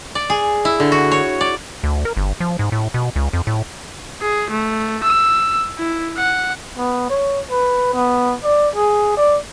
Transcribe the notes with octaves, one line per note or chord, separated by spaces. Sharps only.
D5
G#4
E4
D3
F#4
C#5
D5
D2
A#4
G1
F3
G#2
A2
B2
C#2
F2
A2
G#4
A3
E6
E4
F#5
B3
C#5
B4
B3
D5
G#4
D5